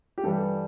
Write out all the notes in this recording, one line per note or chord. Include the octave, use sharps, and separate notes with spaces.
G4
G2 E3 G3 A4